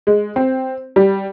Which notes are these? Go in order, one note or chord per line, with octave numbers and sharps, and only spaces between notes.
G#3
C4
G3